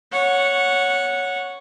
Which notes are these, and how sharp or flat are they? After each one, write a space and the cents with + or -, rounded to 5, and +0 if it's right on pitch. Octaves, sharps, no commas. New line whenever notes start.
C#5 +5 F#5 -10